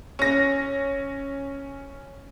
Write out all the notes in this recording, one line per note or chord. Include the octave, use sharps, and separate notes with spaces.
C#4 A#6